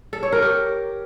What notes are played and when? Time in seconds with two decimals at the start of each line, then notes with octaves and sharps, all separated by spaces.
0.13 A4
0.23 C#5
0.33 A#4
0.42 G4